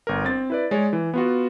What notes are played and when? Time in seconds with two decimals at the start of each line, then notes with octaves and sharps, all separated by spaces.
0.07 G1 A#4
0.25 C4 A6
0.50 E4 B4 D5
0.71 G#3 C#5 D5
0.93 E3
1.14 B3 F4 F#4